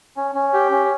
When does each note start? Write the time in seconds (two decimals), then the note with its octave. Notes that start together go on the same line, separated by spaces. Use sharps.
0.17 C#4
0.35 C#4
0.53 G4
0.72 C#4